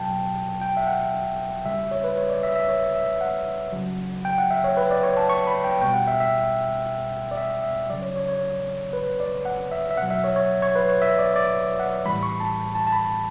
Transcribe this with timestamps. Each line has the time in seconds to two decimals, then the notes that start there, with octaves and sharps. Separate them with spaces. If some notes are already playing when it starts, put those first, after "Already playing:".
Already playing: B2 F#3 G5 A5
0.62 G5
0.77 E5
0.87 F#5
1.64 C#3 G3 E5
1.91 C#5
2.04 B4
2.18 C#5
2.30 D5
2.43 E5
2.56 E5
2.69 C#5
2.96 E5
3.21 F#5
3.72 C#3 F#3
4.25 G5
4.38 F#5
4.51 E5
4.64 C#5
4.77 B4
4.91 D5
5.03 C#5
5.17 A5
5.29 C#6
5.47 B5
5.64 G5
5.81 B2 G3 G5
5.94 F#5
6.07 E5
6.20 E5
7.31 D5
7.37 E5
7.63 E5
7.89 C#3 F#3 D5
8.02 C#5
8.16 C#5
8.29 C#5
8.93 B4
9.20 D5
9.45 F#5
9.72 E5
9.91 E5
9.98 B2 F#3 F#5
10.10 E5
10.24 C#5
10.36 C#5
10.62 C#5
10.75 B4
10.89 C#5
11.02 E5
11.19 D5
11.36 D5
11.79 F#5
12.05 A2 E3 G3 B5
12.23 C#6
12.40 A5
12.75 A5
12.87 A5
12.92 B5